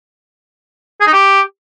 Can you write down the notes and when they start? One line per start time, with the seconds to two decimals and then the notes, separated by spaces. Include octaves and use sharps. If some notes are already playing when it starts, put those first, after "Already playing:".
1.01 G#4
1.07 D#4
1.13 G4